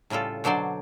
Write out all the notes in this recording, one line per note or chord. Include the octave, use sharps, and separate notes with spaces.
A2 C#3 G3 F4 A4
B2 D3 F#3 C5 D5